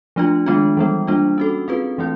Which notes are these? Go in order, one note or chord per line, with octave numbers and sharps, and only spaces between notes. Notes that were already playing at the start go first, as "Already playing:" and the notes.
F3 A3 D4 F4
D#3 G#3 B3 D4 F4
E3 G3 B3
G3 A#3 D4 F4
C#4 F#4 A4
C4 F4 G#4 B4
E3 A3 C4 E4